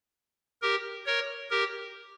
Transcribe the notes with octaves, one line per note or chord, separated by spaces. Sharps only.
G4 A#4
A#4 C#5
G4 A#4